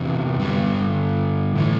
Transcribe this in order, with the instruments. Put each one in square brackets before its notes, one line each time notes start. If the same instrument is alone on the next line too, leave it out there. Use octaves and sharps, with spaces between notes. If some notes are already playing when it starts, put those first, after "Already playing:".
Already playing: [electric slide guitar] E2 C3 E3
G2 D3 G3
A2 E3